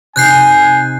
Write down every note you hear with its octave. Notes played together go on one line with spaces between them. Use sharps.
C3 D#4 G#5 F#6 G6 C7